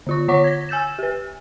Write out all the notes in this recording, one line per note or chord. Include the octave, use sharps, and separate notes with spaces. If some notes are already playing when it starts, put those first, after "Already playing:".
D3 F4 C#6
D3 C#5 F#5 C#6 D6 B6
G#6 A#6
G#5 E6 G6 A6 E7
G4 B4